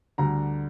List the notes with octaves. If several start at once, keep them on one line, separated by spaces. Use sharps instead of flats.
D2 D3 G3 A#5